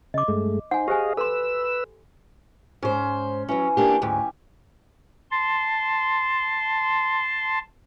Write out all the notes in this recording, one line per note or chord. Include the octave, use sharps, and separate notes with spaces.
C#3 D#5 D6
G2 G#3 A3
D#4 C5 F#5 G#5
G4 G#4 C5 D#5 F5 G#5
A4 B4 B5 C6 E6
G#2 C#4 C5
E3 F#3 C#4
A#3 D4 G4
D2 G#2 G4 G#5
A5 C6